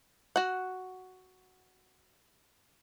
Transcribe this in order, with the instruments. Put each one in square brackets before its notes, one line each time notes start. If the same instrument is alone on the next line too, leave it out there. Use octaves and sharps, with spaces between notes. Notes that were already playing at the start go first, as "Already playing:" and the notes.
[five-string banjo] F#4 F#5